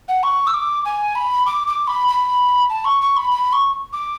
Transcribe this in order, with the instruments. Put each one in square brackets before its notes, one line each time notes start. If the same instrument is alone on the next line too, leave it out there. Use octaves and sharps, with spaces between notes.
[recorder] F#5
C#6
E6
D6
G#5
B5
D6
D6
B5
B5
A5
C#6
C#6
B5
B5
C#6
D6